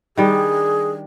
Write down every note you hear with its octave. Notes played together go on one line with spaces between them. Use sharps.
D#3 G3 D4 G#4